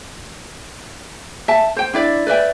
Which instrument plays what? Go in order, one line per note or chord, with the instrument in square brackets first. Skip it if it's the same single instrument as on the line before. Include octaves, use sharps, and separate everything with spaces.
[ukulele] E5 A5
C5 G5
D4 E4 D5
B4 D5 E5 G5